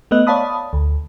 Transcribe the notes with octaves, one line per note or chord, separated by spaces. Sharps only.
A3 B3 B4 D#5 F#6
C#5 D5 F5 A5 B5 D#6
D2